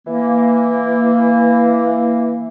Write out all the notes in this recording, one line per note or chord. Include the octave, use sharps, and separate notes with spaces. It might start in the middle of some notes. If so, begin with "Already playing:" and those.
E3 A#3